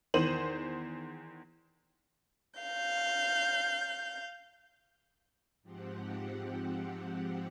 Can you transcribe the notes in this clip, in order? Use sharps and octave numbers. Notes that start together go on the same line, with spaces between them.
E2 D#3 C5 D#7 F#7
F5 G6
G#2 F3 C4 G4 F#5